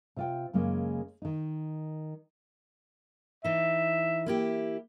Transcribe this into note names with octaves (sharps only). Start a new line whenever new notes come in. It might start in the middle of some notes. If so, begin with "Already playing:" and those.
C3 F4 G5
F#2 C#3 G#3 A#3
D#3 D#4
E3 D#4 E5
A#3 E4 G4